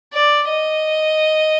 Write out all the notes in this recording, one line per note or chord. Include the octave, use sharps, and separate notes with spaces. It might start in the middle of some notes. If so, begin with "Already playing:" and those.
D5
D#5